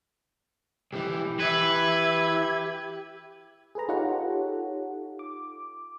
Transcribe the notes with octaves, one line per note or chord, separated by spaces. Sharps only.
B1 E3 G4
E3 B4 E5 G#6
G#4 A4 B4 A#5
D#4 F4 G4 A4 C#5 F#5
D6